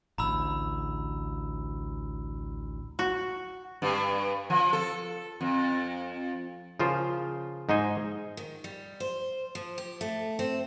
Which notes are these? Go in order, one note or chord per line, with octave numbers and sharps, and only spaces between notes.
A1 D2 A#5 B5 E6
F#4
G2
F3
A4
F2
C#3 F3 F4 A#4 C5
G#2 D#4 C5 D#5 G#5
D#3
G3
C5
F3
G4
A3
C4